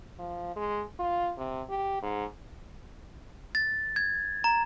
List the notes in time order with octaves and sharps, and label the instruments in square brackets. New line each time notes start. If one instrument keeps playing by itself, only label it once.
[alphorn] F3
G#3
F4
C3
G4
G#2
[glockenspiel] A6
G#6
A#5